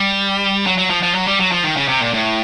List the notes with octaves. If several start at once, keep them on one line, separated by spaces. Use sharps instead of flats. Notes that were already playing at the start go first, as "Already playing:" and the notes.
Already playing: G3
F#3
F#3
F3
F3
F#3
G3
F#3
F3
D#3
C#3
C3
A#2
A2